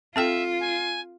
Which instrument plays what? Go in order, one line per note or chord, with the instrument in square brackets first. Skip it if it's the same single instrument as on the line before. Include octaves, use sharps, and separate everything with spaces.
[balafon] C4 A4 G5 [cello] F4 [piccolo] E5
[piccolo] G#5